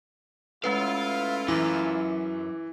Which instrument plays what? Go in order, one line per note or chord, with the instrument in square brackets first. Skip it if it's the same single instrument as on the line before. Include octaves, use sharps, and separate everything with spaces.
[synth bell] G#3 C#4 B4 [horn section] A3 E4 F4 [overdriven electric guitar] F5
[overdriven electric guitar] F#2 [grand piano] E3 [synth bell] D6